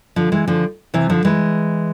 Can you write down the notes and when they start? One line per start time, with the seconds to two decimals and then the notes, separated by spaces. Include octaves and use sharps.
0.16 D3 F3
0.32 E3 G#3
0.48 D3 F3
0.94 C3 E3
1.10 D3 F3
1.25 E3 G#3